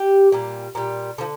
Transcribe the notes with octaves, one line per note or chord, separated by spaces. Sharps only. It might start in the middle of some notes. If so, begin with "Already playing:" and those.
Already playing: G4
A#2 G3
A#2 G3
D3 F3